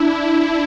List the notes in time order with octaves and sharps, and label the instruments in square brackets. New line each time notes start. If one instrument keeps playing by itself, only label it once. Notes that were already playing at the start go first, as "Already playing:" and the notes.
Already playing: [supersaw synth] D4 E4